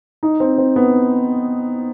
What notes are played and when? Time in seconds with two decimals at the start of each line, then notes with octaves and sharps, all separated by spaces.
0.23 D#4
0.40 C4
0.58 C4
0.76 B3